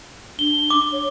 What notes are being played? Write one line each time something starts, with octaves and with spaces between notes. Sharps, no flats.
D4 G7
D6
C#5